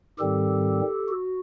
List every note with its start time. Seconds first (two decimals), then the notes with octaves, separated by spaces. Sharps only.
0.18 G#2 D#3 G3 C4 G4 A4
1.08 F#4